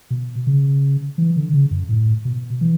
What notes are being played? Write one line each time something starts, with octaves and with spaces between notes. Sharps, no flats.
B2
C#3
E3
D3
C#3
F#2
A2
B2
E3